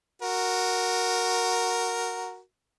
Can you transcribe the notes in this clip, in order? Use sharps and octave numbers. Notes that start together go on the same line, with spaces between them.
F#4 A#4